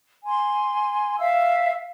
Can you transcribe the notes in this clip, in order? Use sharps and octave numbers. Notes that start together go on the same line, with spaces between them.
G#5 C6
E5 F5 E6